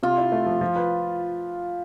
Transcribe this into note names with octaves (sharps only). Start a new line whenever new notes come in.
C3 F4
E4
A3
F3
F3
B4